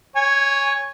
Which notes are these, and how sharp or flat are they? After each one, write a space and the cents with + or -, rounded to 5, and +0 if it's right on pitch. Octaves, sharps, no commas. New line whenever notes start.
C#5 +0 G#5 -20